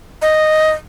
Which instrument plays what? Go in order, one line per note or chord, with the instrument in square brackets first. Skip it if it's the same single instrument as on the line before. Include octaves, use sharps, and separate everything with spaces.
[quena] D#5